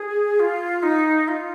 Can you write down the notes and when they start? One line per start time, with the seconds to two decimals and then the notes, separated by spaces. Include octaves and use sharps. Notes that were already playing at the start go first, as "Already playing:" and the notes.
Already playing: G#4
0.40 F4
0.83 D#4
1.28 F4